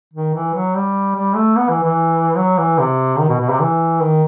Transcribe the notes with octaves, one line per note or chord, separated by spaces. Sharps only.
D#3
E3
F#3
G3
G3
A3
B3
E3
E3
F#3
E3
C3
D#3
B2
B2
C3
E3
D#3